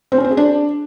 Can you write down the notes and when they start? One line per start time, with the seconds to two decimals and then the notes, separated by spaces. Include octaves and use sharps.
0.12 C4
0.18 C#4
0.25 C4
0.31 G#4
0.37 D4